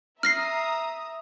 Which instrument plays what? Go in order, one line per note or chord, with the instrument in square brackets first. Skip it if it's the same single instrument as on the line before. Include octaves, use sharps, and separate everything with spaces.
[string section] E5 A#5 D#6 [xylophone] F6 A#6 C7